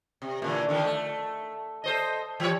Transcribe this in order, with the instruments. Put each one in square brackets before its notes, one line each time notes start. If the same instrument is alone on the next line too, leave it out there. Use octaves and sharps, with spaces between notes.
[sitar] C3
A#2 D3 E3
D3 D#3 F3
A3
A4 C5 D#5
E3 G3 C#5